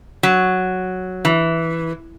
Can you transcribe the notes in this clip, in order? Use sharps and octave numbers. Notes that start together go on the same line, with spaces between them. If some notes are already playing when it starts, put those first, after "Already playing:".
F#3
E3